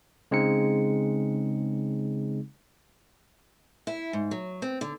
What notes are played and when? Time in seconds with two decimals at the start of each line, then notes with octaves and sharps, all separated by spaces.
0.31 C#3 G#3 C4 D#4 C#7
3.87 E4
4.13 G#2
4.31 F#3
4.62 C4
4.81 D3